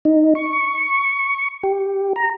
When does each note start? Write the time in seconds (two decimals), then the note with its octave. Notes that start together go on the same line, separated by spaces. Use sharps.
0.05 D#4
0.35 C#6
1.63 G4
2.16 A#5